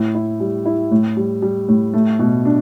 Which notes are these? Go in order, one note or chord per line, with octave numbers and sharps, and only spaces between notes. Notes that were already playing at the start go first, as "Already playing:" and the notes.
Already playing: A2 E4
E4
G3
E4
A2
G3
G3
A2
A3
B2
D4